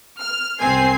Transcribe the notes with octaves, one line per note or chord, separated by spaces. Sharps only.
F6
C2 C4 G#5 C7